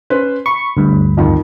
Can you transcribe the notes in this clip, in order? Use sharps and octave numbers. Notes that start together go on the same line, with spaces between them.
C#4 B4 C5
B5 C#6
D2 G2
F2 D#3